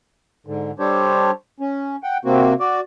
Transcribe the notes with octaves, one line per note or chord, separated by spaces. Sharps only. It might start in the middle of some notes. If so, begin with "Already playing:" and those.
G#2 D3
G3 D4 G4 A4 C5 C#5
C#4
F#5 G5
C3 A#3 C4 F#4
F#4 D5